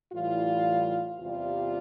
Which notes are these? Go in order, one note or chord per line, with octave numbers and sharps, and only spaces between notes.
A2 E3 G3 F4
E2 C3 G3 F4